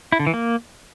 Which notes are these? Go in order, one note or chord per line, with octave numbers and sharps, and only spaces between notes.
E4
D3
E3
A#3